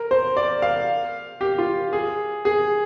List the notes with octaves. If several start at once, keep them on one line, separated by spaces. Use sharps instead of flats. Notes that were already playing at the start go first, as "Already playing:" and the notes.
Already playing: A#4
C5
D5
F5
G4
F4
G#4
G#4